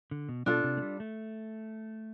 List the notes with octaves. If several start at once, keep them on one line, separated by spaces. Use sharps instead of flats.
D3
B2
B2 D4 F4 A4
C3
A3
G3
A3